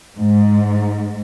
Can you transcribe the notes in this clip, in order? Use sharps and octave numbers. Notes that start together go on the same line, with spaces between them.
G#2